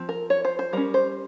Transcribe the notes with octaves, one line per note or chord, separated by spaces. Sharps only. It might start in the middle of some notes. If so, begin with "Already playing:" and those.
Already playing: F3 C4
A#4
C#5
C5
C5
G3 C#4 A#4
C5